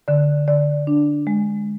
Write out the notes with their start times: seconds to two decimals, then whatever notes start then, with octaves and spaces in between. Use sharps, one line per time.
0.08 D3 D5
0.48 D3 D5
0.87 D4
1.27 G#3